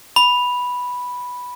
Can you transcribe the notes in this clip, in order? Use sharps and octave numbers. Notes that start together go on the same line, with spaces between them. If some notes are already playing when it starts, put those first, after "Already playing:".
B5